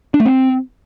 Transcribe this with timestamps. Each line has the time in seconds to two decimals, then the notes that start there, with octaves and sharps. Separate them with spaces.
0.14 D4
0.20 A3
0.26 C4